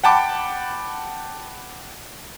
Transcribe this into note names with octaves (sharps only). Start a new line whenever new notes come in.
F#5 G5 A5 B5 D6